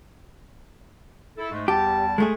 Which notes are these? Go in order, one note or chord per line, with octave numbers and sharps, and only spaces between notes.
E4 A4
G#2 G#3 A3
E2 G3 G4 A5
G#3 A3 G#4